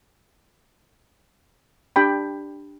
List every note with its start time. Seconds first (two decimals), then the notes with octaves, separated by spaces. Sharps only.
1.96 D4 G4 G5 B5